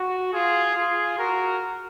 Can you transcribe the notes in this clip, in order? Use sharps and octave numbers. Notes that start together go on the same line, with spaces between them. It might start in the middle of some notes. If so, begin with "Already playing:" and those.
Already playing: F#4
F4 G#4
F4 G#4
F#4 A#4